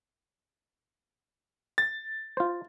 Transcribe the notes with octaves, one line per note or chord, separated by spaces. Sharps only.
A6
F4 C5